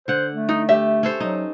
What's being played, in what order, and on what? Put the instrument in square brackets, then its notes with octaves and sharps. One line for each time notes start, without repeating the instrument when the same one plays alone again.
[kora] D3 F#5 [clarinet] C5
[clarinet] A3
[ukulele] D#4
[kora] G4 [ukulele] E5
[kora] C#4 A4 C5
[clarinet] F#3 [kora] D#4